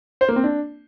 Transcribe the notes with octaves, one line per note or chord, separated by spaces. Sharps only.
C5
A#3
C4
D4